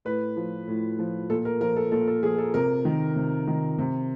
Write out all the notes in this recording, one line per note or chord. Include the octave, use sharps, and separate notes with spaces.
A2 B4
F3
A2
F3
A#2 A4
A#4
F3 A#4
A4
A#2 A4
A4
F3 G#4
A4
C3 A#4
D#3
C3
D#3
C3